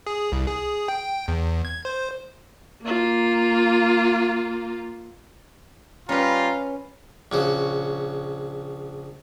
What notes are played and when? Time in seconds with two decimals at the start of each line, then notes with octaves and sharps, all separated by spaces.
0.06 G#4
0.32 C2
0.47 G#4
0.88 G5
1.28 E2
1.65 G#6
1.85 C5
2.82 A#3 F4
6.09 G3 C#4 F4 B4 A#5
7.32 A#1 C#3 F#4